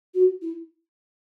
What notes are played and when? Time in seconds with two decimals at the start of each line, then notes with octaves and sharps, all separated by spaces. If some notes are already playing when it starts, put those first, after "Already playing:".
0.14 F#4
0.41 E4